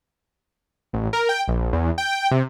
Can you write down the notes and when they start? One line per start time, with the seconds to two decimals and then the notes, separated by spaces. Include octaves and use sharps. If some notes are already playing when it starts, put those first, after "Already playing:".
0.93 A1
1.13 A#4
1.29 G5
1.48 A#1
1.73 E2
1.98 G5
2.31 C3